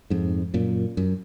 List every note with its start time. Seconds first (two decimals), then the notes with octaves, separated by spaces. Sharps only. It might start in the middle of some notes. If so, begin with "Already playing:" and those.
0.10 F2 G#2
0.54 F#2 A#2
0.97 F#2